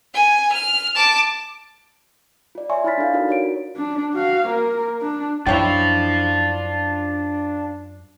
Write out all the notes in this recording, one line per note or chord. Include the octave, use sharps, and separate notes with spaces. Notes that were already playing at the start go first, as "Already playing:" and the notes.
G#5
F6
A5 D6
F4 D5
C#5 D5 E5 G#5 C6 C#6
E4 C#5 B5 F6 A6 B6
D4 F4 A4 F5
D4 D#4 F4 F#4 A#4 D5
F#4 C#5 D7
D4
F#4 F5
A#3 A#4
D4
F#2 D4 E4 F4 C5 C#5 G5